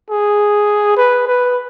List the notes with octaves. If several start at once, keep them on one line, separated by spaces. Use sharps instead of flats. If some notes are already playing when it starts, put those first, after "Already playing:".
G#4
B4
B4